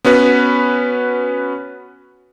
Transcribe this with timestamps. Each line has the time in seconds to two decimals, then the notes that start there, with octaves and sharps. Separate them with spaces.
0.05 B3 C#4 F#4 B4